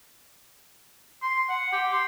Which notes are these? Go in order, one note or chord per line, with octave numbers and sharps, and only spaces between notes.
C6
F#5
G4
C6